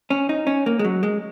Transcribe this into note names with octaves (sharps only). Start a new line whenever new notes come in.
C#4
D#4
C#4
A#3
G#3
F#3
G#3